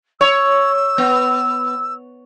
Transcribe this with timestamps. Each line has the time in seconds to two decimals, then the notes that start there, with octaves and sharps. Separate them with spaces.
0.21 C#5 E6
0.98 B3